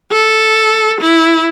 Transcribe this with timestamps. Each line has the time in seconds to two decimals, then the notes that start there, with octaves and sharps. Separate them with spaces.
0.12 A4
1.00 E4